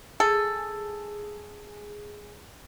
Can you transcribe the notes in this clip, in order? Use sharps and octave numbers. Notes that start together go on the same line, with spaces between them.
G#4 A4